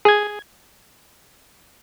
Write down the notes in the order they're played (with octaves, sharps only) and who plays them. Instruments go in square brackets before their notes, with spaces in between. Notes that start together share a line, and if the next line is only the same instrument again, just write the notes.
[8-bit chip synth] G#4 G#6